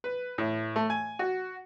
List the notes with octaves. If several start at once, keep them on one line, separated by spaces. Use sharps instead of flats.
B4
A2
A3
G#5
F#4